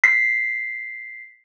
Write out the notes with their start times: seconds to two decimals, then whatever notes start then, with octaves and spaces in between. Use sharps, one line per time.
0.04 B6 C7